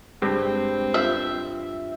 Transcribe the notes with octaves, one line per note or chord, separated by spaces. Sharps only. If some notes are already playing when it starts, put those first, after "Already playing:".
G2 G#3 C4
F4 E5